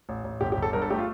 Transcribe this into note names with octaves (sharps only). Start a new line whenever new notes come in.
A1
A1
G1 G4
G4
G1
A4
G2 A#4
A4
A3 G4
F4